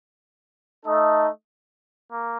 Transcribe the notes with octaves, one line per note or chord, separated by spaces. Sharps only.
A3 D#4 A4 D#5
A#3